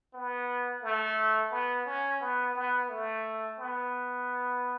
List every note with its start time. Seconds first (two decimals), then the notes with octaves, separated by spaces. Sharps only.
0.14 B3
0.83 A3
1.51 B3
1.86 C#4
2.21 B3
2.55 B3
2.89 A3
3.58 B3